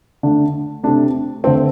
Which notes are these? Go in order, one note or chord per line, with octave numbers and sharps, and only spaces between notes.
D3 A3 D4
C3 A3 D4
D3 A3 C4